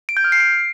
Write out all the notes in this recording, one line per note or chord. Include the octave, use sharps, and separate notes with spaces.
D7
G6
F6
C7
D7